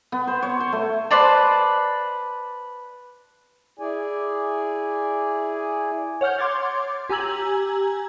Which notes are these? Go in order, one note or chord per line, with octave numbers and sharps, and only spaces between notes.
B3
C5
C#5
C5
A3
B4 C5 D5 A5
E4 G#4 D5 G#5
C#5 F#5 F6 G6
C6 D6 G#6 A6
G4 G#5 A#5 E6 G#6 F#7